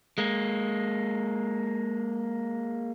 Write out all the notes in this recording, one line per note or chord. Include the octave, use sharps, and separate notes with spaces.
G#3 A#3